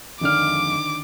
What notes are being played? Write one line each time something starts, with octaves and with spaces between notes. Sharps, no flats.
F2 D3 D#3 G#3 D4 F5 D6